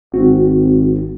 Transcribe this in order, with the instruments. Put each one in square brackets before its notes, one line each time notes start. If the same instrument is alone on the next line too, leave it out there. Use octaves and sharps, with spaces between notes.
[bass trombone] G#1 [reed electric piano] C4 F#4